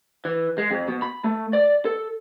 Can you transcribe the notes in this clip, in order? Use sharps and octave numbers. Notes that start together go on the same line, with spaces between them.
E3
G#3
F2
B2
B5
A3
D5
A4